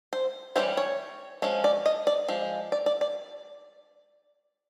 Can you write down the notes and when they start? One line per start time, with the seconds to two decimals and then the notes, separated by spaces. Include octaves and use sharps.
0.13 C5
0.56 E3 G3 A#3 C#4 C5
0.77 C#5
1.42 F3 G#3 C#4
1.64 D5
1.86 D#5
2.07 D5
2.28 F3 G#3
2.72 D5
2.86 D5
3.01 D5